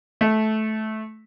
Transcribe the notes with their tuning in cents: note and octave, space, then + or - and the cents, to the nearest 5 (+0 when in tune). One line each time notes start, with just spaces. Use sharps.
A3 -15